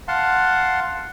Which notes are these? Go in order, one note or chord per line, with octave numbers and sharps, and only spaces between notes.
F5 F#5 A5 C6